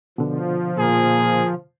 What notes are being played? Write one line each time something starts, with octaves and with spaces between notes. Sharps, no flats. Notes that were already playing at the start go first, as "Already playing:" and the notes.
B2 D3 F3
A#2 G#4 A#4